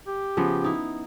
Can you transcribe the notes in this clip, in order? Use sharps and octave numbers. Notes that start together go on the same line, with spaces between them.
G4
C#3 F3 B3
D#4 E4